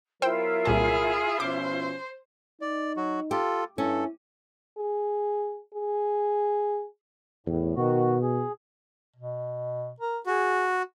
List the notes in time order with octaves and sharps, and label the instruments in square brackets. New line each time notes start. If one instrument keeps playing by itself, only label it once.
[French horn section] F#3 B3 A#4 [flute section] E4 F4 [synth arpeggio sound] C5 G5 E6
[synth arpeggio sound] C2 A#2 A5 [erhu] G#4
[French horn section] B2 F3 C#4 [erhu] C5 [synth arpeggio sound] D6
[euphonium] D#4 [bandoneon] D5
[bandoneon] F#3 F#4
[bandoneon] F4 A4 [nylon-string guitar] G4
[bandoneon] G2 A4 [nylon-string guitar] C#4 [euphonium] E4
[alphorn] G#4
G#4
[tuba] E2 [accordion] A2
[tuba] B2 [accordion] D#3 F#4
[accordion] G#4
[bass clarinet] B2
A#4
[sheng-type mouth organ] F#4 [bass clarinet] G#4